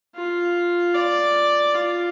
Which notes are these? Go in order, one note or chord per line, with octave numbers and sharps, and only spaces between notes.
F4
D5
F4